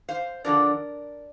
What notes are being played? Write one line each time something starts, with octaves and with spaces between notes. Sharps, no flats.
C5 F5
D3 F3 D4 A#4 D5